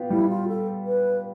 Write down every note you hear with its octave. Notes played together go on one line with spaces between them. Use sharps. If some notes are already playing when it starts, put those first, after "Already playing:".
Already playing: B3 F4 G4
G3 E4
F4
A4
B4